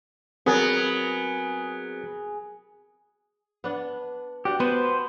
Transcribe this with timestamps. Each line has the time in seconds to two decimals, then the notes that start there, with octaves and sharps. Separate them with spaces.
0.46 F#3 B3 C4 G#4 A#4 D#6
3.64 B3 D4
4.45 D4 F#4 G4
4.60 B3 B4 C5